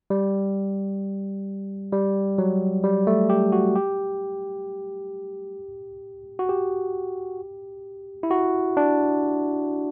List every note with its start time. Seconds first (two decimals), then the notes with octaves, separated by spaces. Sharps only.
0.10 G3
1.93 G3
2.38 F#3
2.84 G3
3.07 A3
3.30 G4
3.52 F#4
3.75 G4
6.39 F#4
6.49 G4
8.23 E4
8.31 F#4
8.77 D4